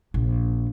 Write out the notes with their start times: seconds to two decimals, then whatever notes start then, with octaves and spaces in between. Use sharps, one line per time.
0.14 A#1